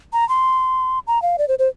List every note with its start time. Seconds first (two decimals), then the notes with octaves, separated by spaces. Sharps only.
0.13 A#5
0.29 C6
1.07 A#5
1.22 F5
1.38 D5
1.48 C5
1.59 C5